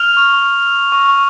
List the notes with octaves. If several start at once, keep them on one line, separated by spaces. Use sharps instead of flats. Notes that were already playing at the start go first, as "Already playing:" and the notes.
Already playing: F6 F7
C#6
F6
E6
C#6